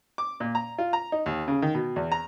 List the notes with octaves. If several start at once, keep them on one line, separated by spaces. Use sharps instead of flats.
D6
A#2
A#5
F4
A#5
D#4
D#2
C#3
D#3
B2
E2
A#5